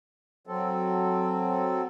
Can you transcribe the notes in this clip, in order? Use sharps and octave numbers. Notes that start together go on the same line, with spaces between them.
F#3 C4 A4